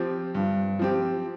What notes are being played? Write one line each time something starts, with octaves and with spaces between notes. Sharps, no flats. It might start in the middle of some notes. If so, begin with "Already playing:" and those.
Already playing: F3 C4 G4
G2
F3 C4 G4